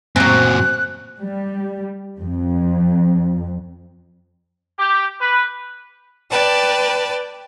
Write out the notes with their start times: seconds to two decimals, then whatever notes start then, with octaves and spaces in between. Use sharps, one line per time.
0.16 F#2 A#2 F#3 C4 F#6
1.19 G3
2.20 F2
4.78 G4
5.20 B4
6.31 B4 D5 G5 A5